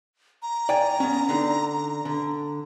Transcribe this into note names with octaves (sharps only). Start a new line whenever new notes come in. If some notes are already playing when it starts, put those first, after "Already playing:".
A#5
D5 G5 G#5
B3 C#4
D3 D4 D#4
D3